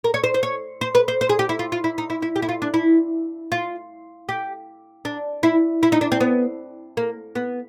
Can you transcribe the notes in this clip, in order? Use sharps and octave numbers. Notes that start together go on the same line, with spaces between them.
A#4
C#5
C5
C5
C#5
C5
B4
C5
C5
G#4
G4
E4
F4
F4
E4
D#4
E4
E4
G4
E4
F4
D4
E4
F4
G4
D4
E4
E4
D#4
D4
C4
B3
A#3
B3